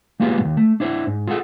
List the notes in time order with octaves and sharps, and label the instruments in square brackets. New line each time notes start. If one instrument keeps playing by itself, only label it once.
[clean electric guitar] G#3 A#3 B3 F4 G4 G#4
D#2 G#2
A3
D4 E4 C5
G#2
F4 G#4 A4 F#5